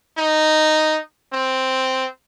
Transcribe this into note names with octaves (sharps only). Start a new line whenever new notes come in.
D#4
C4